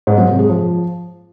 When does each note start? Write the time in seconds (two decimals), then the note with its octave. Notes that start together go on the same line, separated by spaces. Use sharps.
0.07 G#2
0.18 F#2
0.28 C3
0.39 G#3
0.49 F3